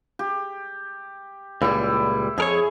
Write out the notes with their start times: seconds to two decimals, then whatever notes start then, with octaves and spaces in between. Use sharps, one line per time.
0.19 G4
1.62 C#2 A#2 G3 E4
2.38 F2 G#4 A#4 C#5